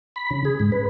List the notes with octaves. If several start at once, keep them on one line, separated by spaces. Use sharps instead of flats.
B5
C#3
G#4
G#2
B4